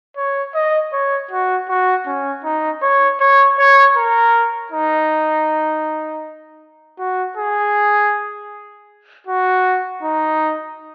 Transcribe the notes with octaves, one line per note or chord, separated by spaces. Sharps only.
C#5
D#5
C#5
F#4
F#4
C#4
D#4
C#5
C#5
C#5
A#4
D#4
F#4
G#4
F#4
D#4